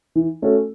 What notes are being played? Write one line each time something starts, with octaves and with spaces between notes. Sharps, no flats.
E3
A3 C#4 F#4 A4